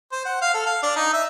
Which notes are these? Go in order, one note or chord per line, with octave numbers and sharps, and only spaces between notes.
C5
F#5
F5
A4
F5
D4
D#4
E5